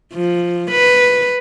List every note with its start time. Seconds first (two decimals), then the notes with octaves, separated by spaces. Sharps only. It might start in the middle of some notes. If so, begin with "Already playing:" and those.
0.14 F3
0.71 B4